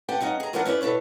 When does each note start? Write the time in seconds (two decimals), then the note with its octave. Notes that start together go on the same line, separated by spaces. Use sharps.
0.09 G4 B4 F#5 G5 A5
0.21 G3 C#4 D#4 F#5
0.40 G#4 A#5
0.53 D#2 E3 A3 A#4 D5 F#5
0.65 C#4 E4 B4 C5 D5
0.81 B2 D4 A4 B4 C#5